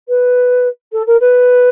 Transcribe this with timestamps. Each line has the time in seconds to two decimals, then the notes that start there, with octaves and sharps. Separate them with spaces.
0.08 B4
0.92 A4
1.06 A#4
1.20 B4